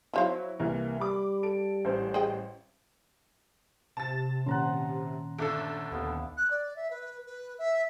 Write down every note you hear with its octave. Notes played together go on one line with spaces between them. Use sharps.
F3 F#3 E4 C5 F5
C2 E3 A#3 A#4
G3 B5 D6
A4 D7
A1 C5
G#4 D#5 G5
C3 A5 A6
A#2 D#3 C#4 F#5 A#5 C6
G1 A3 D4 A4 E6
D#2 B3 F5
F#6
D5
E5
B4
B4
E5